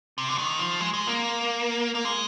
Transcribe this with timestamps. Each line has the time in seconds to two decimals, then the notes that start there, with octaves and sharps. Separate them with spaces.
0.18 C3
0.29 D3
0.38 D#3
0.59 F3
0.80 G#3
0.94 G#3
1.07 A#3
1.95 A#3
2.05 G#3